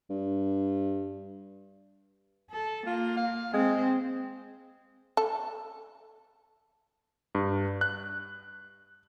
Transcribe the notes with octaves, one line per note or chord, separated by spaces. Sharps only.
G2
A4
A#3 F4
F5
G#3 C4
A4
G2
F#6